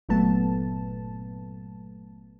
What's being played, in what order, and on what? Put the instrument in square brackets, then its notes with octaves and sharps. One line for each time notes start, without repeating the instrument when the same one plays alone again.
[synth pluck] G1 A#2 F#3 A3 B3 A5